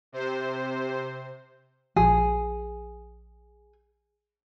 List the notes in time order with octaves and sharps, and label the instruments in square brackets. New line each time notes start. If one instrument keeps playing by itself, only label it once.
[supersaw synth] C3 C5
[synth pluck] A#1 F3 [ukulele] G#4